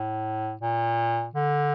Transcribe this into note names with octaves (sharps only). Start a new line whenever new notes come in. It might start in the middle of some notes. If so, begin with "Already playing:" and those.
Already playing: A2
A#2
D3